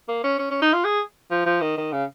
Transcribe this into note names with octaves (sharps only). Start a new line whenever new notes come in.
A#3
C#4
C#4
C#4
D#4
F4
G#4
F3
F3
D#3
D#3
C#3